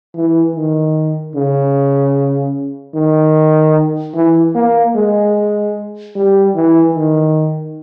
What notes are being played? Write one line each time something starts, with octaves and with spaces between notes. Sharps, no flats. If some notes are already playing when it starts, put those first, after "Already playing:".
E3
D#3
C#3
D#3
E3
A#3
G#3
G3
E3
D#3